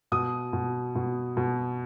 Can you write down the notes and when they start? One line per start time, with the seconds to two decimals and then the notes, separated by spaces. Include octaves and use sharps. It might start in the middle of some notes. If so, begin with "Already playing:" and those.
0.12 B2 D#6
0.53 B2
0.95 B2
1.37 B2